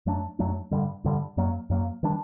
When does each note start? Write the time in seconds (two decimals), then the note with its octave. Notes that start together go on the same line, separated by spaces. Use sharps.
0.06 F#2 F#3 A3 D4
0.39 F#2 F#3 A3 D4
0.71 G2 D3 G3
1.04 G2 D3 G3
1.37 F#2 F#3 A#3
1.70 F#2 F#3 A#3
2.03 D#3 G3 D4